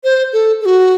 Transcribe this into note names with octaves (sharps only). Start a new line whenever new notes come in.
C5
A4
A4
F#4